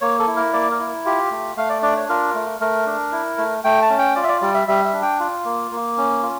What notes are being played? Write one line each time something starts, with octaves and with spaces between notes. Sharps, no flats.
A#3 C#5
A4
E4
A#4
A#3 D5
A#4
E4
F4 G4
A3
A3 F5
D5
D4 D5
C#5
F4 A#4
A3
A3 A#4
D4
E4
A3
A3 G5
A5
C#4
G5
F4 D5
E5
D5
G3 D5
E5
G3 E5
E5
D4
G5
F4
A#3
A#3
C#4
F4